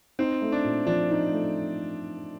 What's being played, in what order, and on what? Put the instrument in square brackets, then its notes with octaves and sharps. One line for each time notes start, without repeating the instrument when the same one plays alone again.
[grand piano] C4 [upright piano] D#4
[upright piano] A3
[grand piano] D4
[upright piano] A#2
[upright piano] F3 [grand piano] D4
[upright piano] D#4
A3